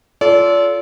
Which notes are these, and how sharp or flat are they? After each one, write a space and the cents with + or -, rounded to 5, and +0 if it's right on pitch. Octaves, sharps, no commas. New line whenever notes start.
F4 -10 A4 -15 D5 -40